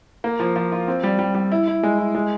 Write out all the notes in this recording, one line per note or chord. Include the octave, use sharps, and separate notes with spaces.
A#3
F3
F3
F4
C4
G3
G3
G3
E4
E4
G#3
E4
G#3